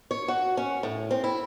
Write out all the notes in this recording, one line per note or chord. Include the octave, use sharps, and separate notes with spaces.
C#5
F#4
C#4
A2
C4
E4